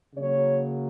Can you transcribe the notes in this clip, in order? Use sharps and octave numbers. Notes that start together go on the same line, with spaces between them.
C#3 F#3 A#3 C#5